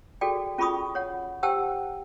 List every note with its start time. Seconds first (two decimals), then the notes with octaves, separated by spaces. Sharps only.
0.21 F#4 G#4 A4 D5 G5
0.58 C#4 F4 G#4 B5 C#6 D#6
0.95 C#5 F#5
1.43 G4 C5 F#5 G5 A5 E6